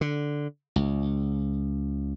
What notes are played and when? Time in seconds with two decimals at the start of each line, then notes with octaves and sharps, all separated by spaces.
0.01 D3
0.76 C#2